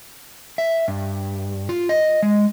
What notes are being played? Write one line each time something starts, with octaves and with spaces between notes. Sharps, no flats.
E5
G2
F4
D#5
G#3